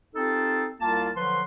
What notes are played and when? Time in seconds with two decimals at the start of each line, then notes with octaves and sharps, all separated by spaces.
0.15 C4 D#4 F4 G4 A4
0.81 C2 A#3 F4 A5
1.16 D3 F3 F#3 B4 C6